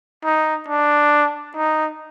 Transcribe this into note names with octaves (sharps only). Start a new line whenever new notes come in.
D#4
D4
D#4